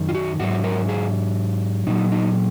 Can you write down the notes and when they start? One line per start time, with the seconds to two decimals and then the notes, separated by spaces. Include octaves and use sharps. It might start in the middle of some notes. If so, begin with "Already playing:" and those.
Already playing: F#2 D#3 F#3
0.09 F4
0.15 F#4
0.40 G#2 F#3 F#4
0.64 A#4
0.89 G#4
1.87 A#2 F#3 D#4
2.12 D#4